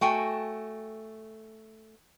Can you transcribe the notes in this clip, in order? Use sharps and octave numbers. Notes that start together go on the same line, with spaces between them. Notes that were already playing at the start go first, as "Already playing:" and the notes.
A3 F#4 G5 G#5